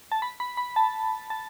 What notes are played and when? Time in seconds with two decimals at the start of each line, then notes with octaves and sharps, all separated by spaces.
0.12 A5
0.22 B5
0.40 B5
0.57 B5
0.76 A5
1.30 A5